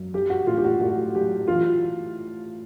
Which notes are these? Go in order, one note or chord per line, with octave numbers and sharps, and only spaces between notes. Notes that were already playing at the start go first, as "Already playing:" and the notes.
Already playing: F#2
F#3 G4
F#4
A2 F4
G4
F#4
A2 F#4
F#3 G4
E3 F4